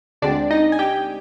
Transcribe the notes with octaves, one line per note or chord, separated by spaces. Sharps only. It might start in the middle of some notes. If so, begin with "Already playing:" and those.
D2 D3 G#3 C4 D4 D5
D#4 D#5
G#5
G4 G5